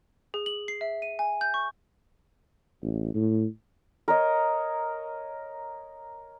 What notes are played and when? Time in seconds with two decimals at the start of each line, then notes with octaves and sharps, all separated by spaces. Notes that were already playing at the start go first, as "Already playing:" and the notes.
0.34 G#4
0.46 F#7
0.68 C7
0.81 E5
1.02 D#7
1.19 G#5
1.41 G6
1.54 C#6
2.82 A1
3.14 A2
4.08 A#4 C#5 D#5